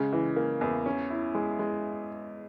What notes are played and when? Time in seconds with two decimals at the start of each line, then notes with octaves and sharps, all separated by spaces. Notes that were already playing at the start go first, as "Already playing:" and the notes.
Already playing: C#3 G#3
0.13 E3
0.36 A#3
0.61 E2
0.86 C#4
1.10 E4
1.35 G#3
1.59 G#3